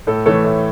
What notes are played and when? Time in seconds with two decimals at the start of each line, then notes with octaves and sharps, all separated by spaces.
0.07 A2 A4
0.26 E3 A3 A4 C#5
0.45 A2